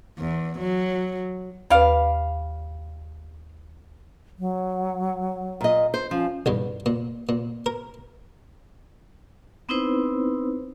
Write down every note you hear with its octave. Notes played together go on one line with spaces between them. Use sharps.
E2
F#3
D#2 G3 B4 F5
F#3
A#2 D#5
C5
F3 C#4
B1 E2 G2
A#2
A#2
A#4
B3 C4 D#4 E4 B4 C5